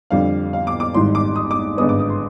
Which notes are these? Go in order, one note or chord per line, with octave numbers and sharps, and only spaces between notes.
F2 D3 G3 D4 F5
F5
D6
D6
G#1 G#2 D#3 G3 C6
D6
D#6
D6
G#1 G2 D3 G#3 B3 D#6
D6
D#6
C6